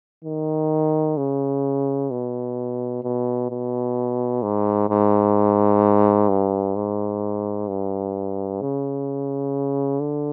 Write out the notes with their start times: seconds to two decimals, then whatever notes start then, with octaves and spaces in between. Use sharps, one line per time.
0.25 D#3
1.17 C#3
2.11 B2
3.03 B2
3.50 B2
4.43 G#2
4.90 G#2
6.29 G2
6.76 G#2
7.68 G2
8.62 C#3
10.01 D3